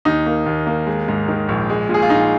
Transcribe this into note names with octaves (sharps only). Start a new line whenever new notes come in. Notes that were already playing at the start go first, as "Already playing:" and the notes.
D#2 D#4
A#3
D#2
A#3
G#3
G#2
D#3
A#1
G#3
A#2
G#4
F4
A#1 D#4